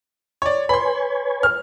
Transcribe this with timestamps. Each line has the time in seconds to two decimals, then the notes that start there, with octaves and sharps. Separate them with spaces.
0.42 C#5 D5
0.69 B4 C#5 G#5 B5 C6
1.43 F6